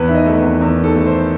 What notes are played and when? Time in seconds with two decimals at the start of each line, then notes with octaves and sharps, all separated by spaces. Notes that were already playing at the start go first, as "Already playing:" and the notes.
Already playing: E2 B4
0.08 D#3 E5
0.15 D#5
0.26 A3
0.38 B4
0.43 E2
0.61 E2
0.78 D#3
0.84 A4
0.95 A3
1.06 C5